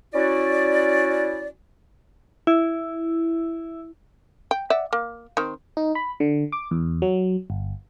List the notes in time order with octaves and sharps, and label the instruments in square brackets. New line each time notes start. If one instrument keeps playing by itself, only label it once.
[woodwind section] C#4 E4 F#4 D5
[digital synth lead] E4
[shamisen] G5
D5 E5 F#5
A#3
D#3 C4
[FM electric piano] D#4
B5
D3
D6
E2
F#3
G1